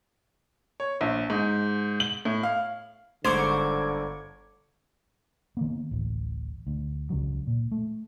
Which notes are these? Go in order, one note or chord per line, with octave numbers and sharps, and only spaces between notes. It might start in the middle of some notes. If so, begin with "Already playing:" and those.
C#5
A#1
G#2
F#7
A2
F5
G1 G#2 D3 C5 C#6 D6 G#6 F7
D#3 A#3 B3
D1 A1
D2
C#2 C#3 F#3
A#2
A3